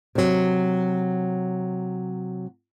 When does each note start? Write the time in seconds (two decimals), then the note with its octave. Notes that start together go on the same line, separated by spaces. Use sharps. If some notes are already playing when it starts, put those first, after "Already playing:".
0.15 C3 F#3